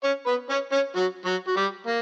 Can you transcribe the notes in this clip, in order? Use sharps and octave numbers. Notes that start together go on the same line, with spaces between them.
C#4 C#5
B3 B4
C#4 C#5
C#4 C#5
F#3 F#4
F#3 F#4
F#4
G3 G4
A#3